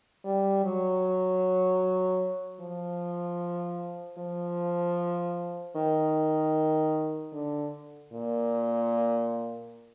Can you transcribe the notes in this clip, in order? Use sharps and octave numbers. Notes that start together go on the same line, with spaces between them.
G3
F#3
F3
F3
D#3
D3
A#2